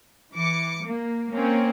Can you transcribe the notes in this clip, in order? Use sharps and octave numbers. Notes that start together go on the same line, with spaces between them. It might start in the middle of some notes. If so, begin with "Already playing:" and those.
E3 D6 C#7
A#3
A#3 C4 C#4